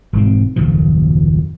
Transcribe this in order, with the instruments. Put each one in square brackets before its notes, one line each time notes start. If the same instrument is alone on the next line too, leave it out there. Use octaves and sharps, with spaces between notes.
[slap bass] E1 G#2 C4
F#1 D#2 A#2 F3